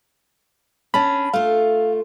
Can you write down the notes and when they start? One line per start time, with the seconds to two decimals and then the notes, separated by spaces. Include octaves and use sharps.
0.94 C#4 D4 A5 B5
1.33 A3 F4 F5